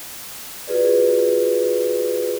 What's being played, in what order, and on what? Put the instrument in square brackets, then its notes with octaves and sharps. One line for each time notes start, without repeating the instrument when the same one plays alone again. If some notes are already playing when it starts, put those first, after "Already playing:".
[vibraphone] F4 F#4 G#4 B4 D5